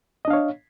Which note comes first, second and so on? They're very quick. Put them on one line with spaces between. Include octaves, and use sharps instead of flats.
D#5 D4 F5 C#5